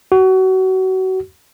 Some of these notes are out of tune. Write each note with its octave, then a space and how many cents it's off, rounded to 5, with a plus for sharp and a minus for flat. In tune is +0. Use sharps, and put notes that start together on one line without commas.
F#4 +30